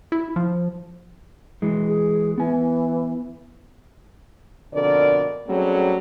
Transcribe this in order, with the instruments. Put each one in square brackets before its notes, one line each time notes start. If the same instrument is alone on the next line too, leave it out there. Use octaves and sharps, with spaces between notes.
[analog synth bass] E4
F3
[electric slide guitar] E3 G#3
[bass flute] G#4
[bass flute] E3 [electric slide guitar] B3 G#5
[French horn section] F2 B2 D3 A#4 D5
F#3 G3 A3 C4 C#4 G#4